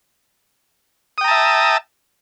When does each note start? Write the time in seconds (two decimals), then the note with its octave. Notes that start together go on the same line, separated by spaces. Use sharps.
1.18 D#6
1.21 G5
1.24 A#5
1.28 A5
1.31 E5